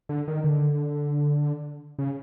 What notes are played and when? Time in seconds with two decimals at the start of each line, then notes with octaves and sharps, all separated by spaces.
0.09 D3
0.28 D#3
0.44 D3
1.99 C#3